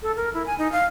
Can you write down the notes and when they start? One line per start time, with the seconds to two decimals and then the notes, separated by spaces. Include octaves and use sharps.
0.02 A4
0.16 A#4
0.34 E4
0.46 G#5
0.58 D#4
0.72 F5